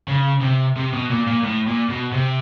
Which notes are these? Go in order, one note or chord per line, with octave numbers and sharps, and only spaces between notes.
C#3
C3
C3
B2
A#2
A#2
A2
A#2
B2
C3